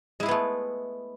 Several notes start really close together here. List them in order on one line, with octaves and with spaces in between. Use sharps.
G#3 E4 G#4 B3 A3